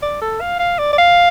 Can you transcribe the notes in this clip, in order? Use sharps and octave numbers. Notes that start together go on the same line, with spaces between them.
D5
A4
F5
F5
D5
D5
F5